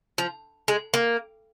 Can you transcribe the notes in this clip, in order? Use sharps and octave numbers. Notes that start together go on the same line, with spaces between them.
F3
G#3
A#3